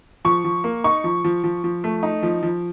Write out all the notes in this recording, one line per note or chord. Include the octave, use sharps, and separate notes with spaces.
F3 C#6
F3
A#3
D#4 C#6
F3
F3
F3
F3
A3
D#4
F3
F3